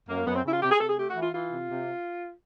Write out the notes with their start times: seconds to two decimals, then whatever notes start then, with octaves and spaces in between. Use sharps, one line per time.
0.09 F#2 A#3
0.26 F#2 B3
0.35 C4
0.44 C#3 E4
0.53 F4
0.62 C3 G4
0.71 G#4
0.80 C3 A4
0.89 G#4
0.98 A3 G4
1.10 F#4
1.16 E3
1.22 F4
1.34 E3 F4
1.51 C3
1.69 C3